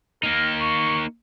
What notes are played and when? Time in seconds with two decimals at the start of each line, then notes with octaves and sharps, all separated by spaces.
0.23 A#3 D#4 A#4
0.61 C#6